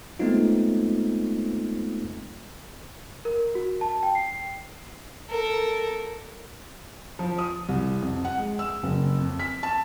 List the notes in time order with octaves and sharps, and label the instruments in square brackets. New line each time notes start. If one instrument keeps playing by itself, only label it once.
[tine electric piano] G#3 A3 B3 C4 D#4 F4
[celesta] A#4
F#4
A5
G5
C7
[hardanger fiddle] A4 A#4
[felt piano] F3
D#6
C2
F2
F#5
G#3
E6
F#1
F2
B6
A5